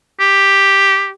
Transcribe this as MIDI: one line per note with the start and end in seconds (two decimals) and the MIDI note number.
0.20 1.10 67